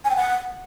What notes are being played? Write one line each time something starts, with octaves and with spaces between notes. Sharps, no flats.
G#5
G5
F#5